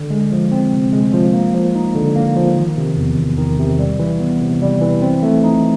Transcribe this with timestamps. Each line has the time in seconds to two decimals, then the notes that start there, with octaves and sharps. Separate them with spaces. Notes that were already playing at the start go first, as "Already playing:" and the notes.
Already playing: D3
0.10 G#3
0.32 F3
0.52 C4
0.73 C3
0.93 G#3
1.13 F3
1.33 A#3
1.55 F3
1.75 D#4
1.95 D3
2.15 A#3
2.37 F3
2.57 D#3
2.77 C3
2.97 E2
3.18 E2
3.38 D#3
3.59 C3
3.79 G3
3.99 E3
4.20 B3
4.41 C3
4.62 G3
4.82 E3
5.02 C4
5.23 A3
5.44 D#4